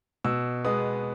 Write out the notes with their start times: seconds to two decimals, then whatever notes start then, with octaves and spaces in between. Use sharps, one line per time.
0.24 B2 E6
0.65 G#3 B3 D#6